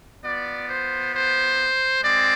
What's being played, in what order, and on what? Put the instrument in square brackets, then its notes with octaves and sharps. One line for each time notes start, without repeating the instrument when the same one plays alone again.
[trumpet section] B3 F4 D5
C5
C5
G#3 C4 D5